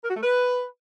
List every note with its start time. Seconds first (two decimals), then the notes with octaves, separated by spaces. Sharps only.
0.04 A#4
0.10 F#4
0.16 A3
0.23 B4